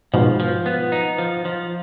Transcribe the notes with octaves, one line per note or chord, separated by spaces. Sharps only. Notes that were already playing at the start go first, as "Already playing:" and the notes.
G#2 B2 F3
F3
B3
D#4
F3
F3